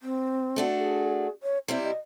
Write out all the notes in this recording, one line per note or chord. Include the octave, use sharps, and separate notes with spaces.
C4
A3 D4 F#4
G#4
C#5
C3 G3 C4 E4
D#5